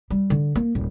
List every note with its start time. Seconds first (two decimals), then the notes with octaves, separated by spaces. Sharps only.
0.10 G3
0.30 D3
0.56 A#3
0.75 D#1